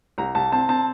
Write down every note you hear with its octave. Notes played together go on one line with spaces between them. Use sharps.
C2 A#5
C2 A5
C4 A5
C4 A5